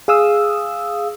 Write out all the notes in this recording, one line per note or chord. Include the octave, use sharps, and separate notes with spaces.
G#4 F5 D#6 E6